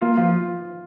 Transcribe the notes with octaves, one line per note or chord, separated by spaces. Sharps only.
A#3 F4
F3 F4